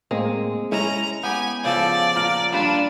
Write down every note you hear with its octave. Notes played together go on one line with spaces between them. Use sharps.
A2 G#3 A#3 C4
G#3 C#4 E4 A#5
B3 G4 G#5
C#3 F3 A4 D5
A#2 A#5 F6
G3 D4 F4 B4